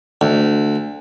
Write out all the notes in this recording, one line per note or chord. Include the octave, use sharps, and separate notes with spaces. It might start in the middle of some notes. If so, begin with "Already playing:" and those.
D2